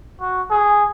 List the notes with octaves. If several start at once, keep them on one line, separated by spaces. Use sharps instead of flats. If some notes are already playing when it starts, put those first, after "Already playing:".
F#4
G#4